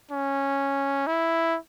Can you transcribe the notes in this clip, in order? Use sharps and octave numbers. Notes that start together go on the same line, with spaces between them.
C#4
E4